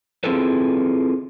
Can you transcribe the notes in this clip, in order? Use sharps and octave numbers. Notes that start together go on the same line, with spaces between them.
C4 E4 F4 G#4 A4 B4